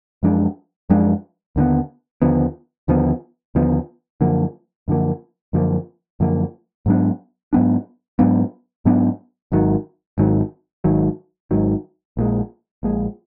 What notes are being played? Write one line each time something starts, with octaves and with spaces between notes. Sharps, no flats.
F#2 F3 G#3 D4
F#2 F3 G#3 D4
D#2 D3 F3 B3
D#2 D3 F3 B3
D#2 D3 F3 B3
D#2 D3 F3 B3
F#2 D3 F3 A#3
F#2 D3 F3 A#3
F#2 D3 F3 A#3
F#2 D3 F3 A#3
G#2 F#3 B3 D4
G#2 F#3 B3 D4
G#2 F#3 B3 D4
G#2 F#3 B3 D4
G#1 G#2 D#3 F#3
G#1 G#2 D#3 F#3
G#1 G#2 D#3 F#3
G#1 G#2 D#3 F#3
A#1 A#2 G#3
A#1 A#2 G#3